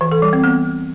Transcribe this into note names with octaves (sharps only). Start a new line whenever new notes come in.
E3
A4
G3
C4
B3